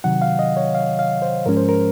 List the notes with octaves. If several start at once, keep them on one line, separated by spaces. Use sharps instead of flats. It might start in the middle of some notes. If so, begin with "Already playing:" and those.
C3 D#3 F#3 F#5
F5
D#5
C#5
F5
F5
C5
G#2 F3 G#3 C#4 A#4
C5
A#4